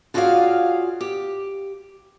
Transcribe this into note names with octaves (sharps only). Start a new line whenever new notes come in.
F4 F#4 G#4 C#5 D5 F5
G4